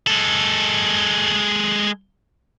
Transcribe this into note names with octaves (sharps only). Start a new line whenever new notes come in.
G#3 A4